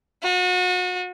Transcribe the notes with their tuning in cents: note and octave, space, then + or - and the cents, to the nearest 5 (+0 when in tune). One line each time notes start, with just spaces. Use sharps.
F#4 -35